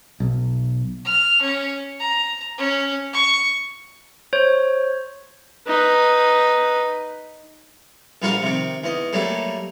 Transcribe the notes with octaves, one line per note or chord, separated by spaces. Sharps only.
B1
F6
C#4
A#5
C#4
C#6
C5 C#5
D#4 B4
A#1 G3 F4 F#4 A#4 F5
C3 D#3
E2 D#5
F#3 G3 A3 A#3